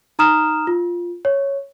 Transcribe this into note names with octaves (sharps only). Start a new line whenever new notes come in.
D#4 A#5 D#6 F6 E7
F4
C#5